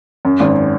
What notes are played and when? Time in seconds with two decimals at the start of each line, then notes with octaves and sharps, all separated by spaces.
0.25 F#2
0.40 G#1